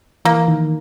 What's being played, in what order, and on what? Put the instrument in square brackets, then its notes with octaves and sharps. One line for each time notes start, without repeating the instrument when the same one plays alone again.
[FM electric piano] E3 [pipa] A#3
[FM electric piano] D#3